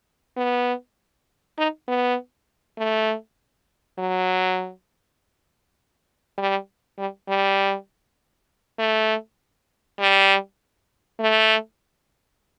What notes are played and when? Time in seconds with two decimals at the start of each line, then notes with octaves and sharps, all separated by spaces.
0.37 B3
1.58 D#4
1.88 B3
2.78 A3
3.98 F#3
6.38 G3
6.98 G3
7.29 G3
8.79 A3
9.99 G3
11.20 A3